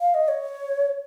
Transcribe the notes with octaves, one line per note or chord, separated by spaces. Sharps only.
F5
D#5
C#5